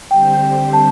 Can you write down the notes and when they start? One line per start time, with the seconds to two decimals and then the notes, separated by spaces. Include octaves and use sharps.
0.10 D3 G3 C4 G4 C5 G5
0.73 A5